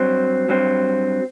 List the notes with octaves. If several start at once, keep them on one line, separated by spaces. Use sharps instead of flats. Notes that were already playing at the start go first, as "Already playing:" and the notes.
Already playing: G2 F#3 C4
G2 F#3 C4